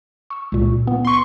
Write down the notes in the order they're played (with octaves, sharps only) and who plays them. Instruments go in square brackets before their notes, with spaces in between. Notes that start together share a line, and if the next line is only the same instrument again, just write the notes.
[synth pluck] C#6 E6
C#2 A#2
B3
[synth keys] C6 C#6